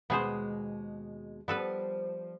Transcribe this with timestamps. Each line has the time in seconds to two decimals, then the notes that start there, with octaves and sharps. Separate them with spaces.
0.10 D#2 B2 G#3 B3 G#4 C5
1.48 F3 G3 B3 A4 B4